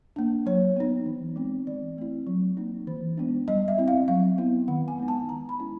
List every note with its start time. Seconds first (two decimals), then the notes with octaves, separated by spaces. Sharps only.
0.16 A#3 D4
0.46 F#3 C#5
0.77 B3 D#4
1.06 E3
1.36 G#3 C4
1.67 E3 D5
1.97 A3 C4 E4
2.27 F#3
2.57 A#3 D#4
2.87 E3
3.17 G#3 B3 D4
3.48 G3 D#5
3.68 E5
3.78 C4 E4
3.88 F5
4.08 F#3 F5
4.38 B3 E4
4.68 D#3 F#5
4.88 G#5
4.98 G#3 B3 D#4
5.08 A5
5.28 D#3 A#5
5.49 B5
5.59 G#3 C#4 E4